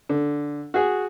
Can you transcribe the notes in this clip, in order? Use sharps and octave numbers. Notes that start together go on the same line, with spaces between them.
D3
F#4 G#4